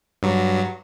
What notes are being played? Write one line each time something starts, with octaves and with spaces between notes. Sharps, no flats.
G2 F#3